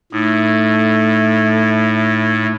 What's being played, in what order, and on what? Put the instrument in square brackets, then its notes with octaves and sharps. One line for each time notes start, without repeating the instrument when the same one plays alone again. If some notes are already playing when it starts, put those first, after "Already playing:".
[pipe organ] A2 [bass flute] A3 [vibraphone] D#4